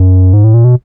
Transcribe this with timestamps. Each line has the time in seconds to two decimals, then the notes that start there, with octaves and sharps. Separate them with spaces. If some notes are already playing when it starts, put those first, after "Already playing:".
Already playing: F#2
0.33 G#2
0.44 A2
0.54 A#2
0.64 B2